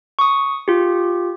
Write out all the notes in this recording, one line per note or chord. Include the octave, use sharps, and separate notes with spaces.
C#6 D#6
F4 G4